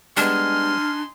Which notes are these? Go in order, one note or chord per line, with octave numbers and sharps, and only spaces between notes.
G3 G#3 B3 D4 D#4 G#5 C6 F6